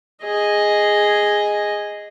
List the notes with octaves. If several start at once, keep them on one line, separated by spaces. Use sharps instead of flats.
G#4 D#5